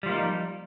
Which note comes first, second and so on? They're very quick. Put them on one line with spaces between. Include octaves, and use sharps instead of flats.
G3 F3 A#3 D#4